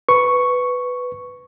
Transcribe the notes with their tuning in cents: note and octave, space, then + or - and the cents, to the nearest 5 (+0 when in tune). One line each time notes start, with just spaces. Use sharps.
B4 +5 C#6 +0